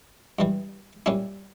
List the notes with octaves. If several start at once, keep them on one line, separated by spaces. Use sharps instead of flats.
G2 E3 G3
A#2 G3 C#4 E4